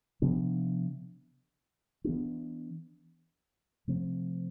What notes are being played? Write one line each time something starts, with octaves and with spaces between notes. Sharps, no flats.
C3 F3 B3 D4
E3 B3 D4
C3 F3 A3 C4